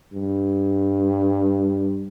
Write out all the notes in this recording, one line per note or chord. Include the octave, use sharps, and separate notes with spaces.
G2